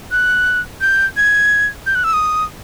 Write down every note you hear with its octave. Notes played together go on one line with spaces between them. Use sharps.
F#6
G6
G#6
G6
F#6
E6
D#6